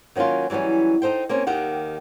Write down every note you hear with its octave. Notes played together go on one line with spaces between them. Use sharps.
D#3 F#3 A#3 C#4 F4
E3 F#3 G3 B3 C#4
D#4 A4 C5 G5
A#3 C4 C#4
D#2 D#3 G4 F#5